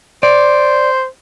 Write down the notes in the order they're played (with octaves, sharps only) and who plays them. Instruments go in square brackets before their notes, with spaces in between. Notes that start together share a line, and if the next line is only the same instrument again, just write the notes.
[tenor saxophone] C5 [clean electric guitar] D5